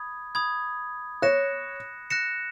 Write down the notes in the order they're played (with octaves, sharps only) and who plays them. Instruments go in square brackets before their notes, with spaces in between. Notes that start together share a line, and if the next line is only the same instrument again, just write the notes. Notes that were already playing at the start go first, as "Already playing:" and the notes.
Already playing: [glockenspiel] B5 D#6 G#6
B5 D#6 G#6
[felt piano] C#5 [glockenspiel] F#6 A#6 C#7 E7
[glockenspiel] F#6 A#6 C#7 E7